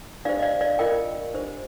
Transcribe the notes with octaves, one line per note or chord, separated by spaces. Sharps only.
D4 G4 C5 D5 F5
D#5
D5 F5
D5 F5
F4 A#4 D#5 G5
D4 G4 C5